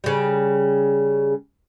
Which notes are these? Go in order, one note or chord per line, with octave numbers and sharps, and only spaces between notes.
C#3 G3